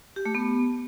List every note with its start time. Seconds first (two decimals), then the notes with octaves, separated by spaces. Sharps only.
0.16 G4
0.25 A3
0.35 B3